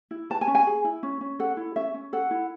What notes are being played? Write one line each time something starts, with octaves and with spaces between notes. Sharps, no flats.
E4
B4 A5
G#5
C#4
G#5
G#4
E4
C#4
C#4
A4 F#5
E4
C#4 E5
C#4
A4 F#5
E4